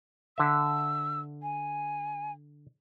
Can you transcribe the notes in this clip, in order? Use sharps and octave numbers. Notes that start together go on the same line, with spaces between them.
D3 E5 E6
G#5